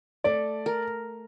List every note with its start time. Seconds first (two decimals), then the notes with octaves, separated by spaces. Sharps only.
0.24 A3 D5
0.66 A#4